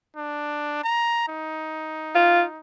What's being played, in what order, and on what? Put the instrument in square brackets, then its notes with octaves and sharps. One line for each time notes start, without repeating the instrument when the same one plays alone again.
[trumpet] D4
A#5
D#4
[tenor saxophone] F4